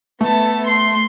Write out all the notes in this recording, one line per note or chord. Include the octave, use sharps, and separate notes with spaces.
A3 B3 A5
C6